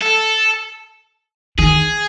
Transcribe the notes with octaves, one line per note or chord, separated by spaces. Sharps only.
A4
D#3 G#4